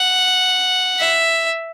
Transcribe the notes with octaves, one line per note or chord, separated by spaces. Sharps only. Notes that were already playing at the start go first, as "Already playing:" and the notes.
Already playing: F#5
E5